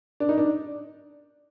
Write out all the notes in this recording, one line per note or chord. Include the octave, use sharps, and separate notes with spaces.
D4
D#4
D4